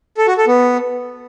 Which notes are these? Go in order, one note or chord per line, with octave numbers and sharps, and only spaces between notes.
A4
F#4
A4
B3